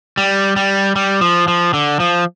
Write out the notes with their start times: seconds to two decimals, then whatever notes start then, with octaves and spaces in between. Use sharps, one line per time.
0.17 G3
0.56 G3
0.96 G3
1.21 F3
1.48 F3
1.74 D3
2.00 F3